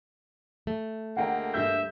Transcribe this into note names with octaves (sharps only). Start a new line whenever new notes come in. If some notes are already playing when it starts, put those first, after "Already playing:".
A3
D2 G#3 A#3 F#5 G5 A#5
G2 E5 G6